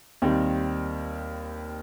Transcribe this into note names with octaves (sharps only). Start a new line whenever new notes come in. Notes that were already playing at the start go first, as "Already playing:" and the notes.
D#2 D#3 G3 C4